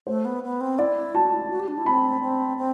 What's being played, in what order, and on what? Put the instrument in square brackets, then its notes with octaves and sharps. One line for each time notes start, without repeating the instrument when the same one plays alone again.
[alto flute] A3 [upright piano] C5
[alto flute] B3
B3
C4
[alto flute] E4 [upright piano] D5
[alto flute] F#4 [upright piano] A5
[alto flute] E4
F#4
G4
D4
E4
[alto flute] C4 [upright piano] B5
[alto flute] C4
C4